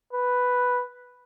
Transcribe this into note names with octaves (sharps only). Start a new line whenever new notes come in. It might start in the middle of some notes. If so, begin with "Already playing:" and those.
B4